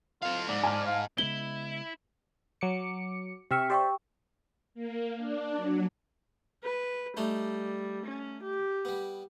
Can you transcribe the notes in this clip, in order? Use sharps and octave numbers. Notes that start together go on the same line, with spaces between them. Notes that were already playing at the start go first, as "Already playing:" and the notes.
F4 A4 F5
G#2 D5
G#5 A5 F6
F5
C#3 G#3 B3 E4 G7
F#3 D6 C#7
C3 G4 E5 G5 C#6 F6
G4 C5 D5 E5 G5 C#6
A#3
D4
F#3
B4
G3 A3 D4 D#4
C#4
G4
G3 B3